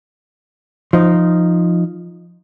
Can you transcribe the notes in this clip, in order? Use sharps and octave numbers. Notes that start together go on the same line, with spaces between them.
F3 D#4